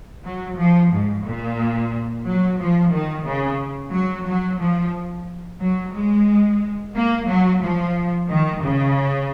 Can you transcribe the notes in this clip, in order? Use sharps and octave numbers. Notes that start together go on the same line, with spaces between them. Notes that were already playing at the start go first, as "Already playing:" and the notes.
F#3
F3
G#2
A#2
F#3
F3
D#3
C#3
F#3
F#3
F3
F#3
G#3
A#3
F#3
F3
D#3
C#3